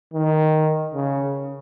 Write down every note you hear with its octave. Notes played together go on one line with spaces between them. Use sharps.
D#3
C#3